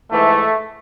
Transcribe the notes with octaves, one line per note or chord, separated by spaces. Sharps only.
G#2 E3 A3